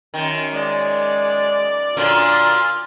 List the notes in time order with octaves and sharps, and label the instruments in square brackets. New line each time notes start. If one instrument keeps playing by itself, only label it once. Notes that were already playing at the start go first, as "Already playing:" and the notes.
[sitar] F#2 D#3
[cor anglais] G#3 [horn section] D5
[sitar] A#2 D3 F#3 [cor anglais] F4